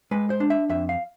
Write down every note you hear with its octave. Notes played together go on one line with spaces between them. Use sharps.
G#3 B4
C5
D4
E5
F2 E5
F5